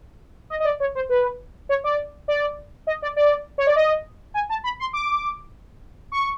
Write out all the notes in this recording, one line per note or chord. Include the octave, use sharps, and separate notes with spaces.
D#5
D#5
D5
C#5
C5
B4
C#5
D5
D5
D#5
D5
D5
C#5
D5
D#5
G#5
A5
B5
C6
D6
C#6